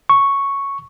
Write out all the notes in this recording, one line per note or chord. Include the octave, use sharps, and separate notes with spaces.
C#6